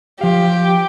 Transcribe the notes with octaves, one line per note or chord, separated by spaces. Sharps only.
F3 G4 F5